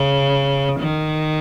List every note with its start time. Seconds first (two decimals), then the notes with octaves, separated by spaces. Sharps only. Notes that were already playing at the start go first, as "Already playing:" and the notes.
Already playing: C#3
0.80 D#3